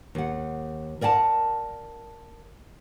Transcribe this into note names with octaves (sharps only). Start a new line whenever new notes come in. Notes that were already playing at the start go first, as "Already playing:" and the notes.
D#2 F#5
A#4 D5 F#5 G5 A5